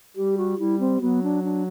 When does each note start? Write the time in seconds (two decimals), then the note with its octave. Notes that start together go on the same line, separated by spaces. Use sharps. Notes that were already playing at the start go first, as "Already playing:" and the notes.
0.16 G3 G4
0.37 F#4
0.58 G3 E4
0.80 C4
1.01 F#3 B3
1.23 D4
1.43 D4